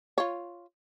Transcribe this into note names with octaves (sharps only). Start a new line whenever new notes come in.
F4 C#5